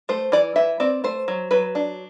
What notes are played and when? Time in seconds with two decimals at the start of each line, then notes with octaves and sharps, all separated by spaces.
0.09 A3 C5
0.32 E3 D5
0.56 E3 E5
0.80 C4 D5
1.04 A3 C5
1.28 F#3
1.51 F#3 B4
1.75 D4